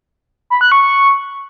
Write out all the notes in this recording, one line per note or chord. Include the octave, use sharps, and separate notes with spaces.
B5
F#6
C#6
C#6